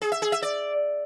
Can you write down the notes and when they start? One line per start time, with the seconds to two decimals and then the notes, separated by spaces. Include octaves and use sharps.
0.02 G#4
0.12 E5
0.22 G#4
0.32 E5
0.42 D5